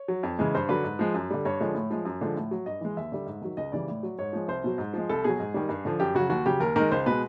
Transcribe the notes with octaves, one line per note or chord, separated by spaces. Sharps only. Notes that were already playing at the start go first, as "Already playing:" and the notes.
Already playing: C#5
F#3
F2
C#3 E3 G#3
G2 C5
D3 F#3 B4
G#2
F3 G#3
F#2
D3 G3
G2 C#5
D3 F3 G#3
A2
F3 G#3
F#2
D3 F3 G#3
A2
F#3
G2 D#5
E3 G#3
D#2 E5
D3 G3
G#2
D#3 F#3
C#2 D#5
C#3 E3 G3 D5
A2
F#3
G#2 C#5
F3 G#3
C2 C5
B2 F#3
G#2
F3 G#3
C2 A4
B2 F#3 G#4
G#2
D#3 G3
G2
D3 F3
F#2 G4
C#3 F#3 F#4
D#2 F#4
C#3 F#3 G4
D#2 A#4
D#3 G#3 A#4
C#2 C5
B2 G#3 B4